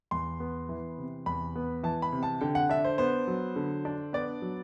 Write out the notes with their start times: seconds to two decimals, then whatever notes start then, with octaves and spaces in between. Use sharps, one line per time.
0.11 E2 C6
0.40 B3
0.69 E3
0.98 C3
1.26 E2 B5
1.56 B3
1.83 E3 A5
2.02 B5
2.12 C3
2.23 A5
2.41 D3 G5
2.55 F#5
2.70 D4 E5
2.85 C5
2.98 B3 C5
3.27 F#3
3.56 D3
3.85 D4
4.13 B3 D5
4.42 F#3